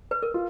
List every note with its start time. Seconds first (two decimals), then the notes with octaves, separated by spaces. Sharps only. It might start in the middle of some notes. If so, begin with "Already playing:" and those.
0.11 B4
0.23 A#4
0.34 F4